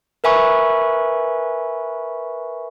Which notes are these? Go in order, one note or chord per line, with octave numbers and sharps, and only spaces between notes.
A#4 B4 E5 G#5 B5 C#6